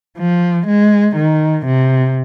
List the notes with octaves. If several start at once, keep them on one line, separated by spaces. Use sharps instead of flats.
F3
G#3
D#3
C3